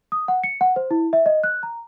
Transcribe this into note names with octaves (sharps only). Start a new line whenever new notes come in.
D#6
F#5
C#7
F#5
C5
E4
E5
D#5
F#6
A#5